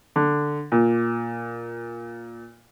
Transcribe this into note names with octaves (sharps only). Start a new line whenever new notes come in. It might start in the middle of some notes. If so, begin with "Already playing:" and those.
D3
A#2